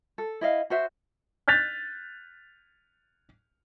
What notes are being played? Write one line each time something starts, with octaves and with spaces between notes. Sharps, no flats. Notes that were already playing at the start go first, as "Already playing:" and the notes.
A4
E4 D#5 F5
F#4 C5 E5
F#6 G6 A6 B6 F7